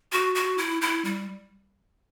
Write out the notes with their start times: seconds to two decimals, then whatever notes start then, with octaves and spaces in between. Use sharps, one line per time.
0.12 F#4
0.35 F#4
0.58 E4
0.82 E4
1.05 G3